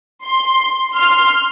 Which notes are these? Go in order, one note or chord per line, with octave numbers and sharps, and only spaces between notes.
C6
C6 F6